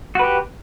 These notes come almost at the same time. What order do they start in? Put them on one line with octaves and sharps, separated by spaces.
F#4 B4 G4